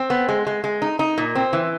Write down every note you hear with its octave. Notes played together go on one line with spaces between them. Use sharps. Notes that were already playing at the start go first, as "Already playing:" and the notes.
Already playing: C4
B3
G#3
G#3
G#3
D#4
D#4
A#2
C4
E3